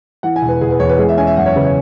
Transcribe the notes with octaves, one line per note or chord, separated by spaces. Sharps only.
E3 F#5
G#5
E1
B4
E1 G#4
B4
E2 C#5
B4
G#3 G#4
E5
C#4 G#5
E5
F#2 F#5
C#5
C#3 B4
C#5